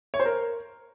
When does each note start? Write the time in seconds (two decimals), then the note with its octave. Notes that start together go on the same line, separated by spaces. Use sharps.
0.14 C#5
0.20 C5
0.26 A#4